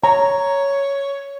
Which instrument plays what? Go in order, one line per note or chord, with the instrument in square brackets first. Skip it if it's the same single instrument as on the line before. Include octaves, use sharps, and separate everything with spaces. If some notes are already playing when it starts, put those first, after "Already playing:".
[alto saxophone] C#5 [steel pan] A#5